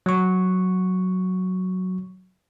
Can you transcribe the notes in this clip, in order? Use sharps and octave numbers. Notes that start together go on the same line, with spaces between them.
F#3 C#6